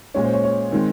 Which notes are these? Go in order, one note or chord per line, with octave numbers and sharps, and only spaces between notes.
A#2 G#3 C#4 C#5
C5
C#5
C#5
D#3 G#3 C4